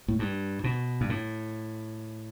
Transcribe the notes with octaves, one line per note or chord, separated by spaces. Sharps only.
A2
G2
B2
G2
A2